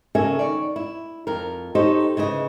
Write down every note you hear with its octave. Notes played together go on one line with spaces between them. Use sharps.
C#3 A#3 C#4 A4 E5 G#5
D#3 C#5 D5
E4
F2 A#4
D#4 G4 A4 C5 C#5 D#5
D2 C#3 E3 F#4 D#5